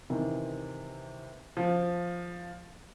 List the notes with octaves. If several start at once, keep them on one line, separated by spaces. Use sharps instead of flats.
C3 D#3 E3
F3